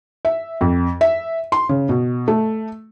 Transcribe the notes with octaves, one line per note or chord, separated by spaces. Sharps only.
E5
F2
E5
C6
C#3
B2
A3